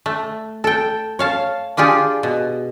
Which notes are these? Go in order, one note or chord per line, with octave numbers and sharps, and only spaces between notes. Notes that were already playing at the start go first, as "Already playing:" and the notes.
A3
A4 G5
C#5 F5 A5
D4 F4 G4 G#4
B2